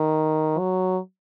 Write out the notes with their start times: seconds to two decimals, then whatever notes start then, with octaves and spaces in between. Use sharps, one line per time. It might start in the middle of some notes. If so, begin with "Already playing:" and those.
Already playing: D#3
0.59 F#3